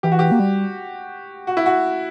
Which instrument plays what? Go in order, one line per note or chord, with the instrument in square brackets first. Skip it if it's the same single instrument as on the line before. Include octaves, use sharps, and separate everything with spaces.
[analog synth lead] E3 [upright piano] G4
[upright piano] F#4
G4
[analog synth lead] A#3
G3
[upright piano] F#4
E4
F#4